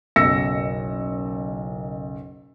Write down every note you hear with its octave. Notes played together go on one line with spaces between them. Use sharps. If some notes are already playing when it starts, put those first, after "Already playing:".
F#1 B1 E6 A#6 C#7